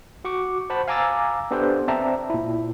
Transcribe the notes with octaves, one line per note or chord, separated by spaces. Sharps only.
F#4 C#6 D6
C5 F#5 A5 B5
F5 G#5 A#5 D6 E6 A6
B3 D4 G4 A4 B4 C5
C4 D5 E5 A5 A#5
A#2 E4